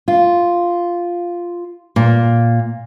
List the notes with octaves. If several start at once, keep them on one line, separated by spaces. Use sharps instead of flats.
F4
A#2